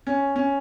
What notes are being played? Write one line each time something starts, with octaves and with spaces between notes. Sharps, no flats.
C#4
C#4